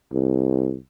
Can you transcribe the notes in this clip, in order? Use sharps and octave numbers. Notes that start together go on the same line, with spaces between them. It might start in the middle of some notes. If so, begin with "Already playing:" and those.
C2